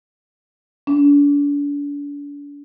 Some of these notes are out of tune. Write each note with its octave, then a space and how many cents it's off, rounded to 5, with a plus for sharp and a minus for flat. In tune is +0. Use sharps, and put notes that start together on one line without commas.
D4 -40